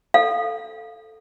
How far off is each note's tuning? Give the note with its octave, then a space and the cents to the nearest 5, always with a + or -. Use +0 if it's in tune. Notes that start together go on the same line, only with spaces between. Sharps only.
A4 +0 F5 +0